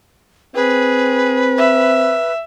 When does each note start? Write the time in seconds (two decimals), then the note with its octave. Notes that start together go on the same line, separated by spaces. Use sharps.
0.55 C4 G#4 B4
1.58 E5